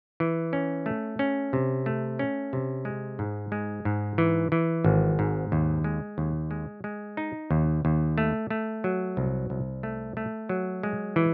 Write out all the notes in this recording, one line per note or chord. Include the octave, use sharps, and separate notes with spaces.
E3
C#4
A3
C#4
C3
A3
C#4
C3
G#3
G#2
G#3
G#2
E3
E3
G#1
G#2
D#2
G#3
D#2
G#3
G#3
D#4
D#2
D#2
A3
A3
F#3
C2
C2
A3
A3
F#3
G#3
E3